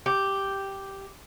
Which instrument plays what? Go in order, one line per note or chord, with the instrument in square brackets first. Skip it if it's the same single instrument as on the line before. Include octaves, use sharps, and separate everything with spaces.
[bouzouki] G4